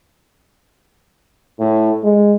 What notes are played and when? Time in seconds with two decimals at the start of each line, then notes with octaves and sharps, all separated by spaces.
1.59 A2
2.04 G#3